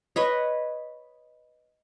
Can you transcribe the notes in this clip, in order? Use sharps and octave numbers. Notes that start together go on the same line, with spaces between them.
B4 C#5 D#5